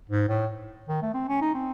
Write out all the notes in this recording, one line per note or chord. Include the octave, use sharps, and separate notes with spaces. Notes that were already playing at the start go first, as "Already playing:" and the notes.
G#2
A2
D#3
A3
C4
C#4
D#4
C4